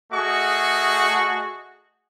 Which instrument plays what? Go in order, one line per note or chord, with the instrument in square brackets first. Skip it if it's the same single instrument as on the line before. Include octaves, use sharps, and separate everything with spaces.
[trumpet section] A3 F#4 G#4 D#5 C#6